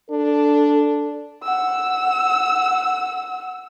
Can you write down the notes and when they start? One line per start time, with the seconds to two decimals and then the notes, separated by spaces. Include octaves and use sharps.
0.10 D4 A4
1.44 F#5 E6